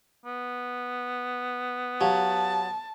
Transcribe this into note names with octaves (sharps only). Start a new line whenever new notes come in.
B3
F#3 G4 F5 A5